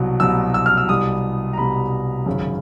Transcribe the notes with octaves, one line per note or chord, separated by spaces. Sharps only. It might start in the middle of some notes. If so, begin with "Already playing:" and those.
Already playing: C2 B2 F#3
C2 B2 F#3 E6
E6
F6
E6
C2 B2 G3 D#6
A#5
C2 B2 G3 B5
G#1 F#2 C#3